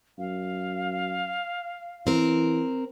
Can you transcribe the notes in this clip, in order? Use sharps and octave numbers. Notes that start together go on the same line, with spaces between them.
F#2 F5
E3 C4 A#4